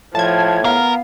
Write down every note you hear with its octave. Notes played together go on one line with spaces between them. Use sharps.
A2 F3 A5 G#6
B3 A#4 F5